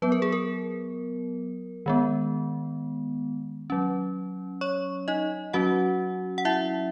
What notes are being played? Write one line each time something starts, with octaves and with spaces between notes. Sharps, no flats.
F#3 B3 B4
A#4
G#4
A#4
D#3 G#3 B3
F#3 C#4
C#5 C#6
D#4 D#5
F#3 C#4 F#4 F#5
F#5
E4 E5